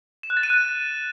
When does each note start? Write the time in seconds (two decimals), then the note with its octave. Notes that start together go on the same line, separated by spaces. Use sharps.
0.23 E7
0.30 F#6
0.37 A6
0.43 D#7
0.50 F#6